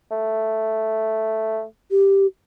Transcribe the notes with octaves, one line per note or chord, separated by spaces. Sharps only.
A3
G4